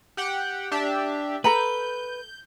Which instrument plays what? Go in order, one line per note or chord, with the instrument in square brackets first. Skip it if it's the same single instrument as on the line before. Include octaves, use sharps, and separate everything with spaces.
[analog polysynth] G4 F#5 G5
D4 G4 E5
[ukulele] A4 A#5 B5 [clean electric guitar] B4 [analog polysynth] G6